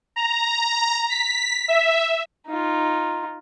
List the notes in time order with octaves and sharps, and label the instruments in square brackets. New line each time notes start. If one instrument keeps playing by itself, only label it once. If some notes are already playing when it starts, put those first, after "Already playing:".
[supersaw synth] A#5
B6
E5
[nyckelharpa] D#4 F4